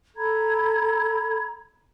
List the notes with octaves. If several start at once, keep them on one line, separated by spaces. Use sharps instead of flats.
A4 A#5 B5 G#6